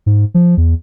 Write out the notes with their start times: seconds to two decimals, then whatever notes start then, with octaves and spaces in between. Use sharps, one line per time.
0.06 G#2
0.34 F3
0.57 E2